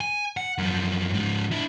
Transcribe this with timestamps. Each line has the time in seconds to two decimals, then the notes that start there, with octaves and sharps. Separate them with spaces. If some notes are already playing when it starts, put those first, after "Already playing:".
0.01 G#5
0.37 F#5
0.58 F#2 F3
1.14 G#2 F3
1.51 D4 E4